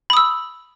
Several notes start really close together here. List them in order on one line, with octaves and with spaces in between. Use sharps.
B5 D#6 E6